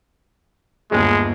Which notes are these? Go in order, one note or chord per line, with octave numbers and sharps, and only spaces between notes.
G1 D#2 G#3